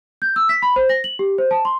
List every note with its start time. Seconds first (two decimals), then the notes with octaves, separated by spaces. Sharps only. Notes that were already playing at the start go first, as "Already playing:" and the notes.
0.22 G6
0.36 E6
0.49 B6
0.62 B5
0.76 C5
0.89 A#6
1.04 F#7
1.19 G4
1.38 C5
1.51 A5
1.65 C6